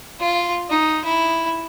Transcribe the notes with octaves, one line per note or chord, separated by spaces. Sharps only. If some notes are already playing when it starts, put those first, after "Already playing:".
F4
D#4
E4